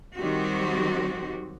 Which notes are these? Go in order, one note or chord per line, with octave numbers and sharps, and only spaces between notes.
D#3 F#3 G3 C4 F#4 G4